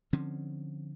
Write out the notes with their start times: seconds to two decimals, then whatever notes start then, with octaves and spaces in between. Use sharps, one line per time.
0.13 D3 F3 C4 C#4